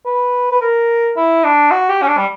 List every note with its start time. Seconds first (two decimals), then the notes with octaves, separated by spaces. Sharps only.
0.05 B4
0.52 B4
0.61 A#4
1.16 E4
1.44 D4
1.71 F#4
1.89 G4
2.02 C#4
2.07 D4
2.17 G3